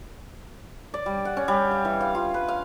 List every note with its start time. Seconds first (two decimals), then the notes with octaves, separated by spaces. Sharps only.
0.94 D5
1.06 G3
1.25 F#5
1.37 C#4
1.48 G3
1.71 F5
1.85 E3
2.00 F5
2.15 F4
2.34 B4
2.48 F5